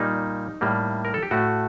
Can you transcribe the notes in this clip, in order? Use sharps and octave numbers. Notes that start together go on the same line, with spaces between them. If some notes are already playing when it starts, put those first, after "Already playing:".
Already playing: A#2 G3 A#3 D#4
A2 G3 A#3
A#4
A4
G4
A2 A3 F#4